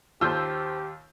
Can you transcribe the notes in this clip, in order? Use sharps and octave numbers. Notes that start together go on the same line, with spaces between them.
D#2 F4 G4 C5 A5 E6 G6